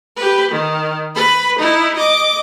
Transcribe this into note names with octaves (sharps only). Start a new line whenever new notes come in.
G4 B4
D#3
B4 B5
D#4 E4
D#5 D6